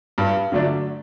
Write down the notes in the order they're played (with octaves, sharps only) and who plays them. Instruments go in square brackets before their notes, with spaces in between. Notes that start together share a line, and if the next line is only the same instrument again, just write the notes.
[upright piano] G2
D3 F#3 A3 D4